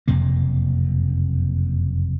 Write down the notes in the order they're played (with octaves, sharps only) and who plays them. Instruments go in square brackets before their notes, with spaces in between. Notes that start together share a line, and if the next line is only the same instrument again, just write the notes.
[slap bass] F#1 F2 C3 A#3